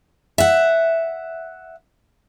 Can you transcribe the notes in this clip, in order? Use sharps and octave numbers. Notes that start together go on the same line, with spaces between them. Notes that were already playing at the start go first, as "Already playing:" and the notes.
E5 F#5